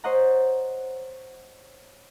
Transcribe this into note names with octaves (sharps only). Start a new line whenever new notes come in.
C5 C#5 D#5 F#5 A#5